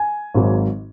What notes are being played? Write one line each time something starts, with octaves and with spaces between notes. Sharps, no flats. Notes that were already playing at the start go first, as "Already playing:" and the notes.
Already playing: G#5
G#1 G#2 F#3